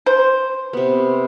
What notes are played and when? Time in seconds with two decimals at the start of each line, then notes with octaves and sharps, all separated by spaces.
0.06 C5
0.73 C3 B3